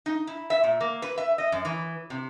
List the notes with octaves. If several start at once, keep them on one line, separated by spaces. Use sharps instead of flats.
D#4
E4
E5
A#2
A#3
B4
E5
D#5
F#2
E3
C3